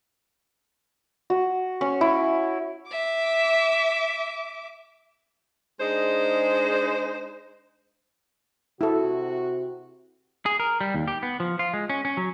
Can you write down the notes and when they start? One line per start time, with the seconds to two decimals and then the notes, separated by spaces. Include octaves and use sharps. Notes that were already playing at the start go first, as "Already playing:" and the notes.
1.30 F#4
1.81 C#4
2.01 E4
2.88 E5 D6
5.80 G#3 D4 D#4 G#4 C5
8.81 C3 E4 F#4 A4
10.46 G#4
10.60 A#4
10.81 G3
10.94 D#2
11.08 G4
11.23 B3
11.40 F3
11.59 F4
11.74 G#3
11.90 C#4
12.05 C#4
12.17 F#3